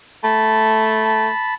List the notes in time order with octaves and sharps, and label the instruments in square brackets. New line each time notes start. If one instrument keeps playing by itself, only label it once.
[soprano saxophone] A3 [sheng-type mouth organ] A5 B5